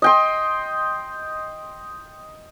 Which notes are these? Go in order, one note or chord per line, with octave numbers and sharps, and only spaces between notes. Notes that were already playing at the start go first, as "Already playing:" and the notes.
D#5 G5 C6